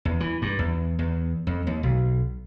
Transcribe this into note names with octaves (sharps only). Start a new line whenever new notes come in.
E2
E3
G2
E2
E2
F2
D#2
B1